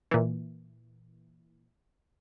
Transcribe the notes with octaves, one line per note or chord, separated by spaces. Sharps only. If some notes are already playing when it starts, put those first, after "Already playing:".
A#2 E3